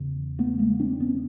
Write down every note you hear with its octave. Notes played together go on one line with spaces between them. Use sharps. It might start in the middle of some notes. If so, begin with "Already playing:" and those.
Already playing: E2 C#3
A3 B3
G#3 A#3
C4 D4
B3 C#4